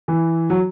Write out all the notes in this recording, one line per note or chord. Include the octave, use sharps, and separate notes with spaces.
E3
F#3